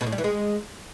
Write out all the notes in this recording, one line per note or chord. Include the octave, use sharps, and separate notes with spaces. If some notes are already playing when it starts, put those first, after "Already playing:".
B2
A2
G3
E3
G#3